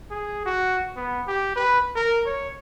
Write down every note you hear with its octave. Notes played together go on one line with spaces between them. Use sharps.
G#4
F#4
B3
G4
B4
A#4
C#5